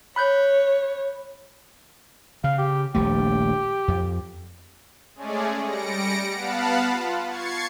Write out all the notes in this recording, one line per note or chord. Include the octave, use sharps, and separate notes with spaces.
C#5 B5 F#6 G6
C#3 F5
G4
D#1 A#1 A3 G4
F2
G#3 A3 C#4 G#4 D5
G3 A#6 C#7 D7
B3 F5 F#5 A5 B5
F4
C#6 G#6 A6 C7 C#7